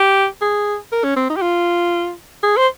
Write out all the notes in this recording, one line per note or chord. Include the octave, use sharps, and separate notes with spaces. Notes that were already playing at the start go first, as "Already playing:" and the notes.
Already playing: G4
G#4
A#4
C#4
C4
D#4
G4
F4
G#4
C5